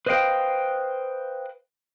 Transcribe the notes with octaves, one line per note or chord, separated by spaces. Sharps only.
B4 C5 D#5 F5 G5